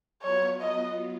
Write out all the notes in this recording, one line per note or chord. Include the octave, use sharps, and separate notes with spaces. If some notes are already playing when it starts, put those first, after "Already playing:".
F#3 B3 F4 C#5
D#5